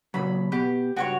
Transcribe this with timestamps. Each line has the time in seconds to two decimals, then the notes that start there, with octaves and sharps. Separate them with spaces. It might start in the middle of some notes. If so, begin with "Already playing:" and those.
0.14 A#2 C#3 F#3 B5
0.52 B2 B3 G4
0.96 C#2 G2 F#4 B4 C#5 G5